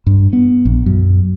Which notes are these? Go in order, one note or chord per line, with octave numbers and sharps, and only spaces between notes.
G2
B3
A#1
F#2